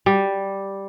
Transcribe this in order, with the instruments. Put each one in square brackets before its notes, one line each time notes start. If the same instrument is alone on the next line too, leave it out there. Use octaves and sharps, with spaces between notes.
[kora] G3